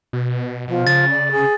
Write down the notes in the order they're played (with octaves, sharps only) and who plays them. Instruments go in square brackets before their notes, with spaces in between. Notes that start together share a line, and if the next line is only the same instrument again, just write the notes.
[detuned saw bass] B2
[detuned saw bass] B2 [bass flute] F3
[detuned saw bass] C#3 [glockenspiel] A6
[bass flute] D5
G#4